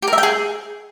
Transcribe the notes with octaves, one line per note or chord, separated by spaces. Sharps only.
G4
A#4
E5
G5
G#4